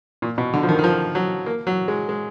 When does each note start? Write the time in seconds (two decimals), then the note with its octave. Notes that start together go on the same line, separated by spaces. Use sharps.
0.22 A#2
0.38 B2
0.54 D3
0.63 F3
0.69 D#3
0.79 D#3
0.84 F3
1.15 F#3
1.46 A#3
1.67 F#3
1.88 G#3
2.09 G#3